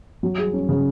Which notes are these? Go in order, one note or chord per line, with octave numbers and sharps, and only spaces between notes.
F#3
G#4
C#4
C#3